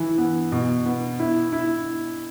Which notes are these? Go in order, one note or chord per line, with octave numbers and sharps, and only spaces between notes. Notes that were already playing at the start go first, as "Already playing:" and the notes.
Already playing: E3 E4
B3
B2
B3
E4
E4